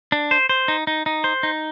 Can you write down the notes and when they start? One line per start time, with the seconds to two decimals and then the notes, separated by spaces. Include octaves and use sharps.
0.12 D4
0.31 C5
0.49 C5
0.68 D#4
0.87 D#4
1.06 D#4
1.24 C5
1.43 D#4